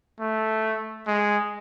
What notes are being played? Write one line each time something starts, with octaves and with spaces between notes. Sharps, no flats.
A3
G#3